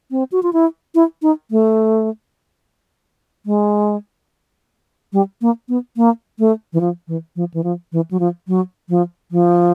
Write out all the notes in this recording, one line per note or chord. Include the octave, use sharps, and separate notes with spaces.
C4
F#4
F4
E4
E4
D#4
A3
G#3
G3
A#3
B3
A#3
A3
E3
F3
E3
F3
E3
F3
E3
F#3
F3
F#3
F3
F3